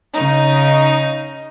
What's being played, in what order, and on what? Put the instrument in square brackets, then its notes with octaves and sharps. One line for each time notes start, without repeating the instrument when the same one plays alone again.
[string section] C#3 D#4